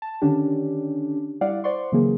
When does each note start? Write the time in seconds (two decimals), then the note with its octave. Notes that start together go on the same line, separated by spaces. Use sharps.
0.02 A5
0.22 D3 D#3 C#4 D4 G4
1.41 G3 E4 D5 F5 F#5
1.64 C5 D5 F#5 C6 C#6
1.92 C#3 E3 F#3 A#3 G#4